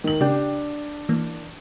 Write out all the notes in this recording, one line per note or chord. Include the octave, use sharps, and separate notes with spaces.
D#3 F#7
C#3 D4 G4 G5
E3 A#3